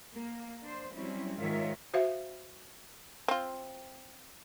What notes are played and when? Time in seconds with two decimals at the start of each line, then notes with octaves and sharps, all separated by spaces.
0.13 A#3
0.63 D4 C5
0.95 F#3 G3 C4 C#4 E4
1.39 G#2 D#3 F4 A#4 C#5 E5
1.94 F#4 C5 E5 F5
3.28 C4 F4